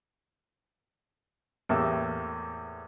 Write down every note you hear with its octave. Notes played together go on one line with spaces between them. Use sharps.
E2 A2 A#3 G4 E6